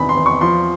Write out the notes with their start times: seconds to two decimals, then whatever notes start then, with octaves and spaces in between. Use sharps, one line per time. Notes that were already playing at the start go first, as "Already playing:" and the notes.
Already playing: E2 C3 D#3 B5
0.09 C6
0.17 E2
0.26 C#6
0.41 F3 C6